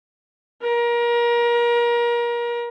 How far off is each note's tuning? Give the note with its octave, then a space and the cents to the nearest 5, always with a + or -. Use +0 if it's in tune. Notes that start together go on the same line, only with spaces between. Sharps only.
A#4 +30